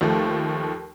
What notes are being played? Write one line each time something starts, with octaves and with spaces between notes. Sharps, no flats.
D#2 F3 A3